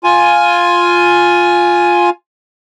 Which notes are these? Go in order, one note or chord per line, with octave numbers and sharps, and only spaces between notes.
F4 G#5